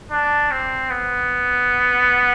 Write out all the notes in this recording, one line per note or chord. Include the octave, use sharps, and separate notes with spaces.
D4
C4
B3